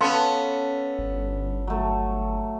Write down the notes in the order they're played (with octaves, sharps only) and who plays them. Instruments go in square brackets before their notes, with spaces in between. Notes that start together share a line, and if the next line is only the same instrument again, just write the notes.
[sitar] B3 C#4 [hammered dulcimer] A4 [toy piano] F5 C6
[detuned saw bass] G1
[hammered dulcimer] F#3 A3